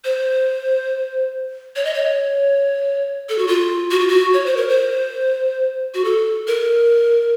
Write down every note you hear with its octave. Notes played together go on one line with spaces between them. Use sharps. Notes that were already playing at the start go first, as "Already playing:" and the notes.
C5
C#5
D#5
C#5
A4
F#4
F4
F#4
F4
F#4
C#5
C5
A#4
C5
F#4
A4
A#4